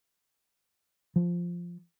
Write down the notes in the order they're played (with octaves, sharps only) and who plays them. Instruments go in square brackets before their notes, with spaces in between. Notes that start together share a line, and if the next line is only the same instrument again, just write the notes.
[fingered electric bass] F3